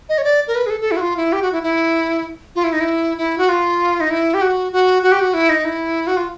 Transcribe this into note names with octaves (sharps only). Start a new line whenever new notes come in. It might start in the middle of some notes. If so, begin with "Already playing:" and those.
D#5
C#5
D5
A#4
B4
G#4
A4
A4
E4
F#4
F4
E4
G4
F#4
E4
E4
F4
E4
D#4
E4
E4
F#4
F4
D#4
E4
G4
F#4
F#4
F#4
G4
F#4
E4
D#4
E4
F#4
F4